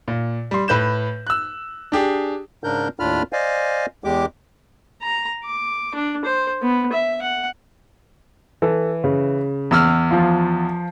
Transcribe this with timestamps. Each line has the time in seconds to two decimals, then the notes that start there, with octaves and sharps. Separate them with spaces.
0.08 A#2
0.51 G3 C6
0.68 A2 B4 G6 E7
1.27 E6 F#6
1.92 D4 G4 G#4
2.64 G#2 C#3 D4 A#4 G6
3.00 D#2 A2 D4 F4 B5 F6
3.33 C5 D5 D#5 F5 G#5
4.04 E2 G#3 G4 D6
5.02 A#5
5.44 D6
5.95 D4
6.25 C5
6.62 B3
6.92 E5
7.22 F#5
8.62 E3 A4
9.04 C#3
9.71 E2 E6 F6
10.11 F3 F4